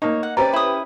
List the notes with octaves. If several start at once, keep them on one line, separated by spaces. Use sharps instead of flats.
A#3 D#4 C#5
F#5
C#4 G4 B4 C5 D5 A#5
E4 D#6